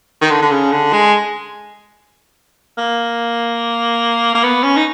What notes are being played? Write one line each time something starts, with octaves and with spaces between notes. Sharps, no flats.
D#3
D3
D3
C#3
D3
G#3
A#3
A#3
B3
C#4
D#4